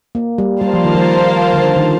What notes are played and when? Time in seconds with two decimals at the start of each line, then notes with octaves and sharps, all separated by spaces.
0.15 A#3
0.38 G3
0.61 G3 A#3 F4 C5 F5 A5
0.73 F3
0.85 D#3
0.95 F3
1.53 D3
1.76 D#3